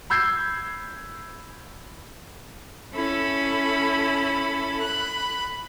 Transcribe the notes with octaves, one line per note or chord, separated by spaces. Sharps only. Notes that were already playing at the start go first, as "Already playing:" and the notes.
B5 E6 G6 G#6 C7
C#4 E4 A4 B5
B5 F#6